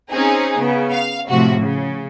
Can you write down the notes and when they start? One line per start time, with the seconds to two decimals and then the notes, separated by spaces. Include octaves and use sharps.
0.11 C4 C#4 D#4 G#4
0.57 C#3 B3
0.92 F5
1.29 A2 C3 F3 F#4
1.62 C#3